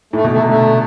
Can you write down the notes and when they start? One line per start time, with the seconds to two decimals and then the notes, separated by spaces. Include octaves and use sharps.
0.13 A2 A3
0.24 B2
0.30 A3
0.36 C3
0.46 D3 A3